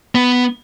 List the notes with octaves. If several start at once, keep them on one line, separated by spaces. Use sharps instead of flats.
B3